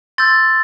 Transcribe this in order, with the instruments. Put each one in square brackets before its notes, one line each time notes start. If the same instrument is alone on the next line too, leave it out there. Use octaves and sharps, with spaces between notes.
[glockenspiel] C6 E6 G6 A6